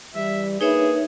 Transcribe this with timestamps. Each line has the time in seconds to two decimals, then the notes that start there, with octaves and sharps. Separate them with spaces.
0.15 E3 G3 E5
0.61 A#3 D4 D#4 G#4 B4 C#5 E5